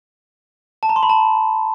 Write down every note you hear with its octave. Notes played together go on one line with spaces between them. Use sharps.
A5
A#5
C6
B5
A5